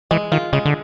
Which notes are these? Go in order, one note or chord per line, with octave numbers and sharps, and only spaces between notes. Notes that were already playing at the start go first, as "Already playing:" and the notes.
E3 G#3
D#3 F4
C#3 G#3
D3